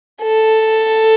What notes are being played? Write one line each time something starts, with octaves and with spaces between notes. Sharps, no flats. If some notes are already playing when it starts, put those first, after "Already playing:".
A4